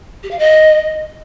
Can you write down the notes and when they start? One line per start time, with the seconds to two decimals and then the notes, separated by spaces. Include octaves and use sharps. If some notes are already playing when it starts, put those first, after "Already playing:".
0.23 G4
0.31 F5
0.39 D#5